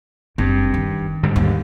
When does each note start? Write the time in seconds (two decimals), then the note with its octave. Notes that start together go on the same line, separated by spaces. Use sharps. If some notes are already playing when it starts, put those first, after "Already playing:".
0.38 F#1 G2 C4
0.74 D#3
1.23 G#2 D3 G3
1.36 D#2